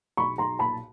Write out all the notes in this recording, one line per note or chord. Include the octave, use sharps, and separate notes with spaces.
B1 B5 C#6
B1 A#5 C6
A#2 A5 B5